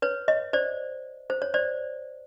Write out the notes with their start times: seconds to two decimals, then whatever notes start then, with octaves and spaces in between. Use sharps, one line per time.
0.02 B4 C#5
0.28 C#5 D#5
0.53 C5 D5
1.30 C5
1.42 C#5
1.54 C5 D5